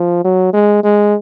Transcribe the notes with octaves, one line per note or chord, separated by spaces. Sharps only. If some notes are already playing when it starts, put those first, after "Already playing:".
Already playing: F3
F#3
G#3
G#3